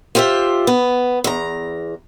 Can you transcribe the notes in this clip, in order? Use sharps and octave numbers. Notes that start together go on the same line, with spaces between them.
F4 G4 C5 D5 E5
B3
E2 A#5